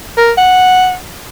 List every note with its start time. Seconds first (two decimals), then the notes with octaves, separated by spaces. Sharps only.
0.18 A#4
0.38 F#5